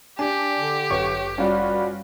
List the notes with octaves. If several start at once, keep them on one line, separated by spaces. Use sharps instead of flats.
D4 G4 G#5
D3
G1 F#2 B4 C#5 C#6
G3 C#4 F4 F#4